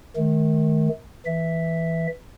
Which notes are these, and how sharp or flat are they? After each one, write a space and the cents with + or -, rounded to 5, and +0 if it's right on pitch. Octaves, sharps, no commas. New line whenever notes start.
D#3 +0 A3 -35
E3 +0 E5 +0